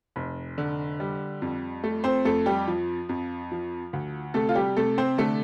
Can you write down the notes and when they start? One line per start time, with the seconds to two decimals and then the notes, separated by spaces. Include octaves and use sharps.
0.16 F1
0.58 D3
1.00 G3
1.42 F2
1.84 A3
2.04 C4 C5
2.25 F2 A3 A4
2.46 G3 G4
2.68 F3
3.09 F2
3.52 F3
3.93 D2
4.34 C3 A3 A4
4.49 F4
4.55 G3 G4
4.77 C3 A3 A4
4.98 C4 C5
5.18 D3 A3 A4